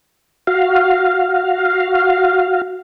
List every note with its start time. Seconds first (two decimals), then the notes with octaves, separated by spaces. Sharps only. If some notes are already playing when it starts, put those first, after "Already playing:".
0.47 F#4 F5